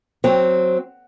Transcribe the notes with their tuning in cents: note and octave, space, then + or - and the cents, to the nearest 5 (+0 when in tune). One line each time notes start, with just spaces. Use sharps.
F#3 +0 C4 +0